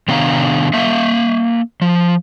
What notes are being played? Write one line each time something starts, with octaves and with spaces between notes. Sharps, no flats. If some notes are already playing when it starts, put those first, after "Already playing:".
C3 D#3 B3 D4 F5 A#5
A#3 E5 F5
F3